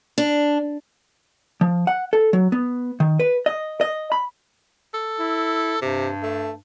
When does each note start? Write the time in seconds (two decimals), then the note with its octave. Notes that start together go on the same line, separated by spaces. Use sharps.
0.18 D4
1.61 F3
1.87 F#5
2.13 A4
2.33 F#3
2.52 B3
3.00 D#3
3.20 B4
3.46 D#5
3.81 D#5
4.12 B5
4.94 A4
5.20 E4
5.82 G2 C3
6.23 A3